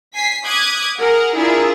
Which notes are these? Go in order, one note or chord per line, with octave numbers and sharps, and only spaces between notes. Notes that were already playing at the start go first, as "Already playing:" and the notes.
G#5 B6 C7
D6 D#6 F#6 G#6 B6
G#4 A#4 F#5
D4 E4 F4 G#4 A#4